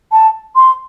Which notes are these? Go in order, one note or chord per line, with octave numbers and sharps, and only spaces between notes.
A5
C6